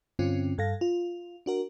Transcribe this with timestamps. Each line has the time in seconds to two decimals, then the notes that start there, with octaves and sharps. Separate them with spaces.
0.19 G2 D3 C4 C#4 F4
0.58 G2 A4 F5 A#6
0.81 F4
1.46 D4 F#4 A#4